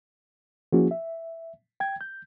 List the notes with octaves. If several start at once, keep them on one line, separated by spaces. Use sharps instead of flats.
F3 A#3 C#4 E4 F#4 G#4
E5
G5 G#6
G6